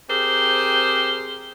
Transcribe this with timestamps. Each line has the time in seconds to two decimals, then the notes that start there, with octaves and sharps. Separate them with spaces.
0.09 C4 G4 G#4 A#4 C5